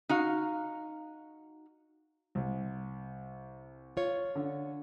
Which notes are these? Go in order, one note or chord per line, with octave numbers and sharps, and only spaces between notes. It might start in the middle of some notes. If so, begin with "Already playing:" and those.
D#4 F#4 F5
C2
F4 C#5
D3